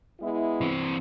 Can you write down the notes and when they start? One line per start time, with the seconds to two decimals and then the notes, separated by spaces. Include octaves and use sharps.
0.21 G#3 B3 E4
0.61 E3 C4